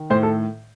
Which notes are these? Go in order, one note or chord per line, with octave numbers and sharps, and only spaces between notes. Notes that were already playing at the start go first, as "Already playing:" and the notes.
Already playing: D#3
A2 C5
A4